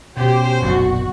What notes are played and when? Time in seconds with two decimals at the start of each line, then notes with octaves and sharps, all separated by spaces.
0.17 B2 C#4 G4 C5
0.62 F#1 B1 A#2 F#4